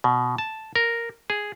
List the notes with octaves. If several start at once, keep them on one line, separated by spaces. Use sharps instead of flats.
B2
A5
A#4
G#4